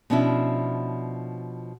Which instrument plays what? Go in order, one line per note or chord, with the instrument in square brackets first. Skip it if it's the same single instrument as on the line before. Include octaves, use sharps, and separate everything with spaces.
[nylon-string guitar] B2 F3 C#4 D4 E4